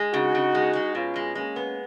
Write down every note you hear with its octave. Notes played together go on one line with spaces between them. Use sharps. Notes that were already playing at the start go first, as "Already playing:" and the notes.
Already playing: G#3
C#3 D#4 F#4
C#3
G#3
G#3
B2 C#4 F4
G#3
G#3 A#3 C#4
B3